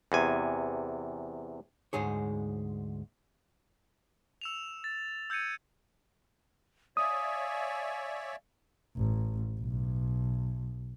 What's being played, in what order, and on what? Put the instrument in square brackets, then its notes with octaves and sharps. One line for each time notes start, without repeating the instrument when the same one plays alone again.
[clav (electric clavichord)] E2 C3 G#5
[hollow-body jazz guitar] D2 G#2 G#3 G#4 C#5
[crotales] E6 E7 F7
A6
E6 G6 G#6 C#7 D#7
[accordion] C#5 D5 E5 [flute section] F5 G#5 [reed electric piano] D#6
[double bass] A1
B1